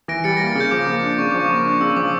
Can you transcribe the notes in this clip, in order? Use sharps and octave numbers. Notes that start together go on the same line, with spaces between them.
E3 A#6 D7
G3 A6 C#7
A#6
A#3
A6
C#3
G6
F3 D6
A#3
D4
C#3 C#6
F3 D6
C#6
A#3
D4 C#6
C#3 E6
F3 D6